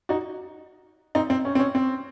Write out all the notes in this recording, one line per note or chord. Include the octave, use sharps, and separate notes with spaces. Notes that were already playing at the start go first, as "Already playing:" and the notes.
D#4 F#4
C4 D#4
C4
C#4
C4
C#4
C4